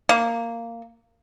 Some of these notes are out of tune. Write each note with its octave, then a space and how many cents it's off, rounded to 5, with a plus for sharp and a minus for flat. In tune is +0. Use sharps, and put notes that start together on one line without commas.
A#3 -10